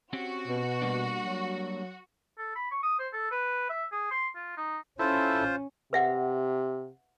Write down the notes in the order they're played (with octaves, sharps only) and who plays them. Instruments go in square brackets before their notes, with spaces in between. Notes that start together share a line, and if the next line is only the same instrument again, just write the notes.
[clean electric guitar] C4 C#4 G4 [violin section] F#4
[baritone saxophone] B2
[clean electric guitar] G3 A#3 D4
[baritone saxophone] F#3
[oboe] A4
B5
C#6
D#6
C5
A4
B4
E5
G#4
C6
F4
D#4
[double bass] C#4 [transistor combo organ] E4 A4 [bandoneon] F4 C5
[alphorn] C3 [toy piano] B4 E5 F#5